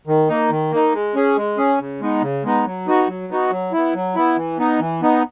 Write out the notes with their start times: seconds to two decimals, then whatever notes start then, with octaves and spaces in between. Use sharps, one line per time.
0.07 D#3
0.29 A#3 D#4
0.50 D#3
0.72 A#3 D#4
0.93 G#3
1.15 C#4 G#4
1.37 G#3
1.58 C#4 G#4
1.79 C#3
2.01 G#3 B3 D#4
2.22 C#3
2.44 G#3 B3 D#4
2.65 F#3
2.86 B3 D#4 F#4
3.08 F#3
3.29 B3 D#4 F#4
3.51 F#3
3.72 B3 E4
3.94 F#3
4.15 B3 E4
4.37 E3
4.58 B3 D#4
4.80 E3
5.01 B3 D#4